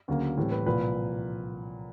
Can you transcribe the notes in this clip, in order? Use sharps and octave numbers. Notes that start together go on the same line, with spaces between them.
D2 C#3 F#3 A#3
A2 E3 G3 C4
B4
C2 A#2 F3 B4